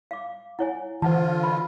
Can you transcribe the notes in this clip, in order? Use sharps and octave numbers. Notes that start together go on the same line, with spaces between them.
F5 D6
E4 C#5 F#5 G#5
D3 E3 F4 C5 F#5 A5
B4 D#5 B5